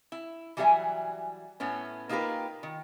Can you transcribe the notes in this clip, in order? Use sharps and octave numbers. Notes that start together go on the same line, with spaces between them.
E4
E3 F#3 G3 A4 E5 G#5
A2 B3 C#4
A#3 D#4 F4 G4 A#4 B4
D#3